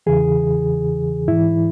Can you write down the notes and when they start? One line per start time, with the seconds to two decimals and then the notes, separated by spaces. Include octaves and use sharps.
0.06 E2 C#3 E3 G#4
1.28 G#2 E3 E4